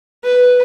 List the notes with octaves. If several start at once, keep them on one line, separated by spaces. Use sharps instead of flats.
B4